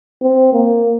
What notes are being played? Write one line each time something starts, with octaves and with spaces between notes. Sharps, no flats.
C4
A#3